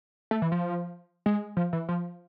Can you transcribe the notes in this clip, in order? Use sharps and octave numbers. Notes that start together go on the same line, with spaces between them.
A3
E3
F3
G#3
F3
E3
F3